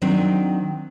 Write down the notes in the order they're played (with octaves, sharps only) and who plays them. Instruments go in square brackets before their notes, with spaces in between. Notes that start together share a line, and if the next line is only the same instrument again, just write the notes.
[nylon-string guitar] D#3 F#3 C4 D4